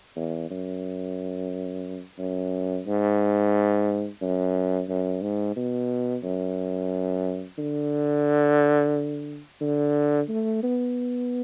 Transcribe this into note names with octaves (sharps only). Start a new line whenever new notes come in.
E2
F#2
F#2
G#2
F#2
F#2
G#2
B2
F#2
D3
D3
A3
B3